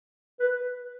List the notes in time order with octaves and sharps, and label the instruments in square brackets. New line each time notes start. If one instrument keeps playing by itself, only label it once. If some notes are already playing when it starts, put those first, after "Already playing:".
[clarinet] B4